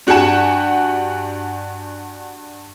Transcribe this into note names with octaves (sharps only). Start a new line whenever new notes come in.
G2 F#4 G4 F#5 G#5 E7